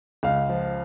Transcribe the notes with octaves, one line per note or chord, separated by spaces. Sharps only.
C#2 F5
F3